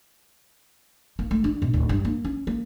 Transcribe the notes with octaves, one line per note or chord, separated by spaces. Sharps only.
A#3
A3
D4
B2
D1
G2
A#3
C#4
A#3